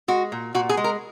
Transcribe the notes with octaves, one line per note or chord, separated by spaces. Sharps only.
G#3 F#4
A#2
A#2 F#4
G#4
G#3
A#4